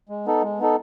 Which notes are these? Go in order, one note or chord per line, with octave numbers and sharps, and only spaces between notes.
G#3
B3 D#4 A4
G#3
B3 D#4 A4